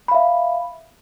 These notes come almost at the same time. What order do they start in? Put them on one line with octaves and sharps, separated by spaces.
B5 F5 E5